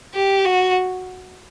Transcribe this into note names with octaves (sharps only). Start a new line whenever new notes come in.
G4
F#4